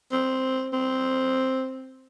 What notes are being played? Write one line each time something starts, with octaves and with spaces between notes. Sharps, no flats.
C4
C4